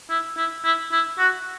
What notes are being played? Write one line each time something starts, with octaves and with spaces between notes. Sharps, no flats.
E4
E4
E4
E4
F#4